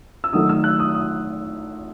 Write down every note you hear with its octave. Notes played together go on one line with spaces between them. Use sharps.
E6
D#3 F#3 A3 D#6
E6
F#6
D#6
D#6